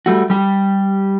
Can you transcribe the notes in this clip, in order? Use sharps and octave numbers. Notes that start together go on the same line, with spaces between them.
G3 A3 F#4
G3 G4